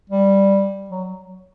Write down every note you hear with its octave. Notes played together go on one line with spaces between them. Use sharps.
G3
F#3